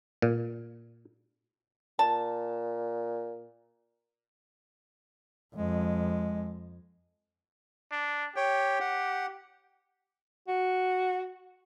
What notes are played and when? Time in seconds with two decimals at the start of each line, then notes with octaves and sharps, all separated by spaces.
0.22 A#2
1.99 A#2 A5
5.56 F2 G#3
7.92 D4
8.36 G4 C#5 G5
8.81 F#5
10.48 F#4